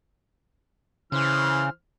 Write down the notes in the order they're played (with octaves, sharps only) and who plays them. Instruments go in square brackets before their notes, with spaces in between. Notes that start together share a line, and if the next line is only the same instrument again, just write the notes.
[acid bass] C#3 [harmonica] E3 C5 F6